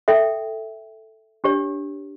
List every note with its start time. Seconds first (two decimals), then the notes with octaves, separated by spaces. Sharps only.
0.08 A4 E5 G5
1.44 D4 G4 C#5